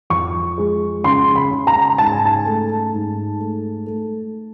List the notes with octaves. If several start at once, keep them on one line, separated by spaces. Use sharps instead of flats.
F2 C#6
G#3
C#3 C6
B5
C#3
A#5
G#2 A5
G#5
A5
A3
G#2
A3
A3